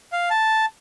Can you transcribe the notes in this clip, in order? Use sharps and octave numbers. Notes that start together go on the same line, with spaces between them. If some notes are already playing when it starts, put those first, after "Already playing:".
F5
A5